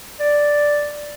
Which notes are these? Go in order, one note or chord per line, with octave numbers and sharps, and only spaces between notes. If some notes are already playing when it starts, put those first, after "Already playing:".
D5